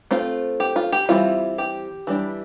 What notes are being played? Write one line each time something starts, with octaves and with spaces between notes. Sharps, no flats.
A3 C4 F4
G4
F4
G4
E3 G3 C4 E4 F4
G4
E3 G3 D4